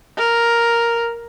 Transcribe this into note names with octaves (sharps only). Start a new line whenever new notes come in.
A#4